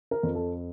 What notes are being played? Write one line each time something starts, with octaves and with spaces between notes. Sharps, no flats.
A#4
F2
A4